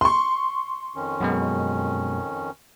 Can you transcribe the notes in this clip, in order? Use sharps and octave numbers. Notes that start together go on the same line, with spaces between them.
C6 C#6
F2 D#3 C#4
F#2 B2 G#3